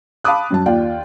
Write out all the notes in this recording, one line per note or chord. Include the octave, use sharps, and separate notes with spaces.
F5 A5 B5 D6 D#6 F#6
F#2 F#3 A5
D#2 F4 D5 G5